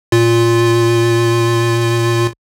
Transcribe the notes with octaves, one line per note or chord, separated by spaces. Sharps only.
A#2 F4